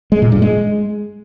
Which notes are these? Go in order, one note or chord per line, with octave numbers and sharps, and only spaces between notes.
G#3
A#2
G2
G#3